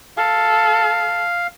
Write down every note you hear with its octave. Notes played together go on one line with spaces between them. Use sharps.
A4 F5